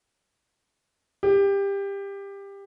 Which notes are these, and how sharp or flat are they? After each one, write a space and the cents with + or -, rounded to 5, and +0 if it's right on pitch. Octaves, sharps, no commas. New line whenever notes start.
G4 +20